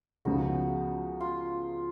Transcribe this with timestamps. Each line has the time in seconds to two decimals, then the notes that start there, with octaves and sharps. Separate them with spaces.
0.25 C#2 C#3 F3 B3 D#4 F#4
1.21 F4